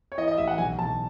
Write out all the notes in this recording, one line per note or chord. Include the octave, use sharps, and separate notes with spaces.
C#5
E3 D#5
D#5
A1 E5
F#5
B1 G#5
B1 A5